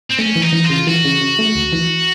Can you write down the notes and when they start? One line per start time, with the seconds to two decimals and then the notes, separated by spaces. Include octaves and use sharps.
0.11 C4
0.19 A3 C#4
0.36 E3
0.42 D#4
0.53 E3
0.65 F4
0.70 C#3
0.87 E3 F#4
1.05 C#3
1.21 C#3
1.39 A3
1.55 D2
1.72 E3